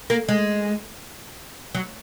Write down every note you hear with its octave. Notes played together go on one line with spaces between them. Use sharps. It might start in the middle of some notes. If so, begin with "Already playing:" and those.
A#3
G#3
F#3